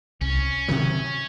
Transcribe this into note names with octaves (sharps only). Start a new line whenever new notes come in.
C2 C#4
C3 D#3 F#3